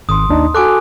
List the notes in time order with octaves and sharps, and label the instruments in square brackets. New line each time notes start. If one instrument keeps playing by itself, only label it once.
[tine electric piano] G#1 [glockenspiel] C6 D#6
[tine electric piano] D#2 D4 D#4
[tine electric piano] F#4 A4 [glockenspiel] G#5 D6 F#6